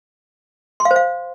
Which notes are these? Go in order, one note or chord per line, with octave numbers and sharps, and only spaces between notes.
C6
F5
C5
F5